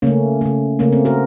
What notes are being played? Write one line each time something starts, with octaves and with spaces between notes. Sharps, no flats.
C#3 A3 A#3 C#4
C#3 A3
C#3 A3 A#3 C#4
C4
F#4 A#4